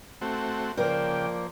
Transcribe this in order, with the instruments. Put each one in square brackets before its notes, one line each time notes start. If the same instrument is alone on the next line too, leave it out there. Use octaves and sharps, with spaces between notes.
[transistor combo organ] A3 C4 F#4
[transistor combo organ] C#3 [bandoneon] F3 A#3 [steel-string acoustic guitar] A#4 C5 D5 [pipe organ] G5